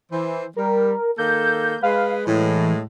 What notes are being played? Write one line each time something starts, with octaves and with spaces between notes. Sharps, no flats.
E3 C5
G3 A#4
D#3 A#3 A4 G6
G#3 B4 F5
A2 E3 G#3